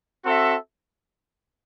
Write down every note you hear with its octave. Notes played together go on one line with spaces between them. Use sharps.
C4 F#4 A4 E5